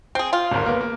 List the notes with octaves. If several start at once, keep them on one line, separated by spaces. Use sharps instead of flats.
C4 G#4 G5
F4
D1 G#1 A#4
A#3 B3
A#3